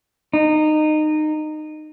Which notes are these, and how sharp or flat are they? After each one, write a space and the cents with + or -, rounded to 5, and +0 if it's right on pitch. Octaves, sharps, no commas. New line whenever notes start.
D#4 -20